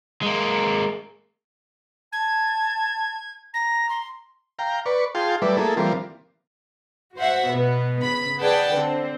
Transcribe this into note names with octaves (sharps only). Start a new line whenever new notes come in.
G#3 A#3
A5 G#6
A#5 A#6
C6
F5 G5 A#5
B4 D5 C#6
F4 G#4 F5 G5 A5 C6
F#3 G3 A3 B4 D5 E5
A3 A#3 E4 G#4 A4
E3 F3 G3 A#3 C4
F#4 C5 E5 F#5
B2 B3
C#3 B5
G#4 B4 D5 F#5 G5 A5
D3 C4